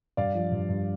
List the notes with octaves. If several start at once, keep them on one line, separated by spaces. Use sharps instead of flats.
G2 D5 F5
F3
G2
G2